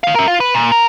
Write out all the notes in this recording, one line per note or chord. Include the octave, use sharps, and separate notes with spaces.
D#4 F5
A#4 E5
F4
B4
A#2
A#4